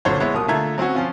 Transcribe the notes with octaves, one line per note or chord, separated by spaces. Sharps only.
F#1 A#2 D3 F#3 C5 C#5
G#3 B3 E4 C#5
D#1 B2 A#4 D#6
D3 A3 F4 E5 A#5 G#6
F#3 C4 C#4 F#4
F3 C#4 F4